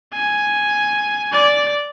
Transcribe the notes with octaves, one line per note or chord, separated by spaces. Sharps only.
G#5
D5